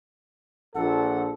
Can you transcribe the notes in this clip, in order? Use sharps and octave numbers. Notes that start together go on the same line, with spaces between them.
A#1 A#2 A4 F#5